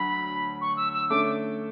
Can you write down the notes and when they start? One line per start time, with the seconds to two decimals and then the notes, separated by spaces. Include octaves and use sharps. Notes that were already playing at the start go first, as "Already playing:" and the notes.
Already playing: D2 F#3 B5
0.61 C#6
0.77 E6
0.93 E6
1.10 D3 A3 C#4 D6